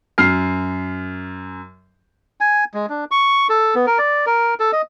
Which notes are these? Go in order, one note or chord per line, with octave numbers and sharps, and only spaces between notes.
F#2 F6 C7
G#5
G#3
D4
C#6
A4
B3
A#4
D5
A#4
A4
D#5